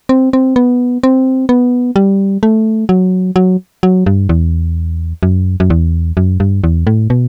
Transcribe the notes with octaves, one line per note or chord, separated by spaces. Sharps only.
C4
C4
B3
C4
B3
G3
A3
F#3
F#3
F#3
G2
E2
F#2
F#2
E2
F#2
G2
E2
A2
B2